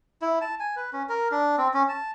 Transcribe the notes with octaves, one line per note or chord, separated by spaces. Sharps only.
E4
A5
G#5
B4
C#4
A#4
D4
C4
C#4
A5